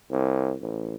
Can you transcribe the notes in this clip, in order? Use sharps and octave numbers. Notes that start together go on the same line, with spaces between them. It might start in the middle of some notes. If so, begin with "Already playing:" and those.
C2
A1